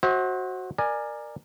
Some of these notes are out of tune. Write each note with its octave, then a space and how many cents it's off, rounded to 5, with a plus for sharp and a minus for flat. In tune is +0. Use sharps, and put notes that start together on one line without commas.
F#4 +0 C5 +25 E5 -45
A#4 +0 D5 +25 G#5 +0